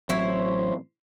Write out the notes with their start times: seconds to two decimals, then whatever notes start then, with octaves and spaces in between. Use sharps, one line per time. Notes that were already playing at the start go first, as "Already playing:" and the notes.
0.09 A1 F#3 C4 E4 C5 C#5